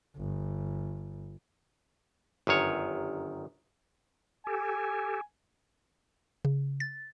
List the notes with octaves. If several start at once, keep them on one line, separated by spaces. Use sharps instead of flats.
G1
G1 F#2 D#3 C#5
G4 A4 G#5
C#3
A6